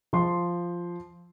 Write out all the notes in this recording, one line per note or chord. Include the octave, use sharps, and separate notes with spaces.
F3 C6